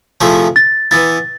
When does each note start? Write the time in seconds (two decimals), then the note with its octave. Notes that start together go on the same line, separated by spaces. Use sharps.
0.21 C3 F3 A3 E4 G#4
0.56 A6
0.91 E3 B3 E4 A6